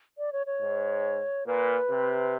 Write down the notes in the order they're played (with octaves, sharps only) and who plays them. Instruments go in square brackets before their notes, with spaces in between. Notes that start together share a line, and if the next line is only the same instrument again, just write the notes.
[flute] D5
C#5
C#5
[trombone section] G#2
[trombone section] A#2 [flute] B4
[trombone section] C3